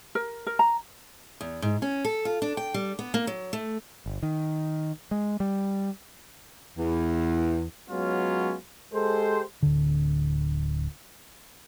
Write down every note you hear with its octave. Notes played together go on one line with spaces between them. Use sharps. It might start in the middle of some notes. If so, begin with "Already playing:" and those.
A#4
A#4
A#5
E2
G#2
C#4
A4
F4
D4
G5
G3
B3
A#3
F#3
A3
G1
D#3
G#3
G3
E2
F#3 G#3 B3 C#4 F4
G#3 G4 A4 C5
D1 D3